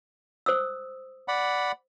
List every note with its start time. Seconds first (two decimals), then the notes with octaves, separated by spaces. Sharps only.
0.46 C5 D#6 E6
1.28 D5 F#5 B5